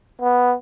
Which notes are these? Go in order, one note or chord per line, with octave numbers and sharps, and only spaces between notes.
B3